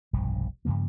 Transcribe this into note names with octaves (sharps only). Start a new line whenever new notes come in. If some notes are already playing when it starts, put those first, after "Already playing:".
F1 B1 G2 F3
G2 C#3 F3 A#3